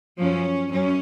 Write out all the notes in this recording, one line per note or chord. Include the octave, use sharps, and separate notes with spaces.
F#2 F3 C#4
F#2 C#4